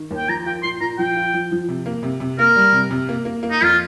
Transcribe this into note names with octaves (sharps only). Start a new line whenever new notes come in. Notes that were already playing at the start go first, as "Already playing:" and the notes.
Already playing: D#3
D#2
G5
F3 A#5
F4 G5
A#2 C6
A#2 A#5
F3 G5
F4
F3
F3
C3
A#3
C3
C3
A#3 A#4
G3
C3
C3
A#3
A#3
A#3
D#4
F2 F4